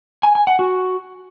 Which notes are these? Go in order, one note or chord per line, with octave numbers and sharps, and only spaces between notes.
G#5
G#5
F#5
F#4